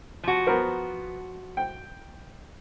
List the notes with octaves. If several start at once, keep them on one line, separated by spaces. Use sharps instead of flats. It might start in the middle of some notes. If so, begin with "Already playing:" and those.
F3 F#4
B3 A#4 C5
G5